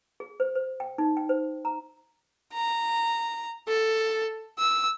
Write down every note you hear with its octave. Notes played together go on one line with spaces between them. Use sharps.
G#4
C5
C5
G5
D#4
G5
C5
A#5
A#5
A4
E6